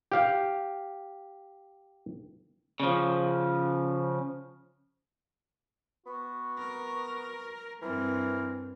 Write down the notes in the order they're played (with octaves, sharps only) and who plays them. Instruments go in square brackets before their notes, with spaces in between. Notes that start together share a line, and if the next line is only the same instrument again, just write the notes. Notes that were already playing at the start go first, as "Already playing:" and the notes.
[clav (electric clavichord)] G4 F5
[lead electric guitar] C#3 F3
[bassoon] B3 [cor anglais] F#4
[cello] A#4
[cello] G2 C4 [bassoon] E3 [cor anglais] A#4